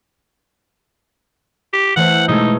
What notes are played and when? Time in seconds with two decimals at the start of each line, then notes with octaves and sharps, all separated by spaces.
1.73 G4
1.96 E3 A3 C5 F#5
2.28 B2 G#3 A3 D#4